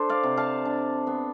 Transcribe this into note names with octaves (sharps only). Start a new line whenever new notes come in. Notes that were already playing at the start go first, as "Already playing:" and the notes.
Already playing: D4 A4 C5
D5 F5
C3
F5 A5
D4
B3